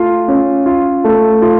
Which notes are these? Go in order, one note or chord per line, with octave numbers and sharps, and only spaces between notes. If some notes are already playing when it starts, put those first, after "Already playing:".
Already playing: A3 F4
C#4
F4
A3
F4